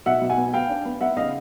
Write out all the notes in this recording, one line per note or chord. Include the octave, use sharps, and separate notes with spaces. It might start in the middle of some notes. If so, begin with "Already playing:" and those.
B2 E5 F#5
B2
F#5 G#5
B3
B3 F5 G5
D4
B3
B3 E5 F#5
C#3 D#5 F5